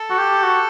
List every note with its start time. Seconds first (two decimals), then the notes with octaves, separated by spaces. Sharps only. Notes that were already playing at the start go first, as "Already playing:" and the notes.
Already playing: A4
0.10 F#4
0.18 G4
0.43 F#4